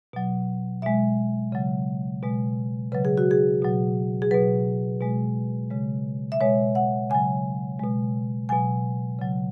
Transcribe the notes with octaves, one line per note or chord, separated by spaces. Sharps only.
B2 F#3
B2 G#3 E5
C#3 F#3
B2 G#3
C#3 F#3 B4
G#4
F#4
G#4
B2 F#3
G#4
B2 F#3 B4
B2 G#3
C#3 G#3
E5
B2 G#3 C#5
F#5
C#3 F#3 G#5
B2 G#3
B2 F#3 G#5
C#3 F#3